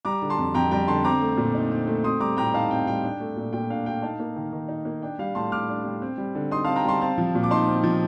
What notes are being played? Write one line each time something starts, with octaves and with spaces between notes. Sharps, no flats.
G3 A#5 D6
D3
A5 C6
F2
F2 G5 A#5
G3 G5 A#5
D3 A5 C6
C4 A#5 D6
A3
A#2
D#4
C4
A3
C4 C6 D#6
G3 A#5 D6
A2 G5 A#5
D#4 F5 A5
C4 G5
G3 G5
D4
A3
A#2
A#2 G5
D4 F5
A3 G5
D#4 F5 A5
A#3
D#3
D#3
D#4
A#3
D4 G5
G3 F5
A2 A5 C6
A2 D6 F6
D4
G3
C4
G3
D3
D#4 C6 D#6
C4 F5 A5
G5 A#5
G3 A5 C6
C4 F5 A5
F3
A#2
D6
D#4 A5 C6
C4
F3